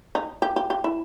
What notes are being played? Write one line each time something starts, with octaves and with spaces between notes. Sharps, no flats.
D#4
G4
G4
G4
E4